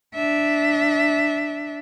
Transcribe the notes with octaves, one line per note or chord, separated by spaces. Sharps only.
D4 E5